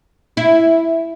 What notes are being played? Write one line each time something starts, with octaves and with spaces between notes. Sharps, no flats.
E4